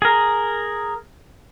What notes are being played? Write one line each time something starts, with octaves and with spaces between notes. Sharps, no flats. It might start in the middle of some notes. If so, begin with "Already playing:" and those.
G#4 A#4